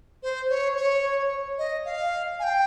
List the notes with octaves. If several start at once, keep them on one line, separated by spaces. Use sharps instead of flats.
C5
C#5
C#5
D#5
F5
G#5
G5